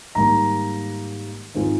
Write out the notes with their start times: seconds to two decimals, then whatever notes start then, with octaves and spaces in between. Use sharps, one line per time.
0.15 G#2 D#3 G3 A#3 A#5
1.54 G#2 D#3 G#3 C4 F4